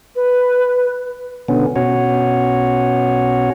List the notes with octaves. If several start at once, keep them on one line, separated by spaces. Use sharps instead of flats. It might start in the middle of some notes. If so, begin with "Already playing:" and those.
B4
B2 D3 B3 C#4
B2 C#4 F#4 C#5